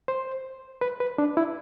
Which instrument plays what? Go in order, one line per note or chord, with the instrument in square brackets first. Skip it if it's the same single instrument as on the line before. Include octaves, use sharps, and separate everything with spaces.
[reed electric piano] C5
B4
B4
D4
E4